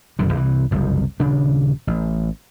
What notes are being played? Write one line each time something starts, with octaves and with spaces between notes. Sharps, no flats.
D#1 F#2 D3
C2 C3 D#3 E3
F#1 C2 F2
D#1 C#3 D4
A1